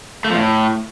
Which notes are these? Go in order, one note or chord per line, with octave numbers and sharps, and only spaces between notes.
A3
F3
A2